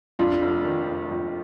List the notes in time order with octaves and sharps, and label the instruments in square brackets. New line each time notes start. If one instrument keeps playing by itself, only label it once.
[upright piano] F2 [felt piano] D4 F4
[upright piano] F1
D#3
F1
F2